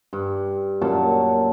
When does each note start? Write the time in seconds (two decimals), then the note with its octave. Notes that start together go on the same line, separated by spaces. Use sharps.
0.13 G2
0.82 F#2 A#2 F#3 A5